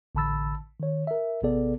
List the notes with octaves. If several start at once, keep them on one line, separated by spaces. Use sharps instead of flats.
A1 D3 A5 B5 E6 A6
D#3 C#5
A#4 E5
A1 C3 B3 G#4 A4 D5